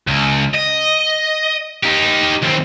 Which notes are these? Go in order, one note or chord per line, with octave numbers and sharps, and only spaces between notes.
C#2
D#5
D#4 G4
D#2 C4